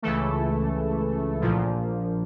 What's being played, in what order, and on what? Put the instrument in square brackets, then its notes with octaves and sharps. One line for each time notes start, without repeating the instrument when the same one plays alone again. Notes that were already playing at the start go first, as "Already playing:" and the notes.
[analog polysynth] C#2 C#3 E3 A3 A4
A#1 A#2 F3